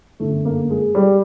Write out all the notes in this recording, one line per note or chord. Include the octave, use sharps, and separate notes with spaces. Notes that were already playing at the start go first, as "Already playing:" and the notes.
G1 F#2 D3 A3
A#3
G#3
G3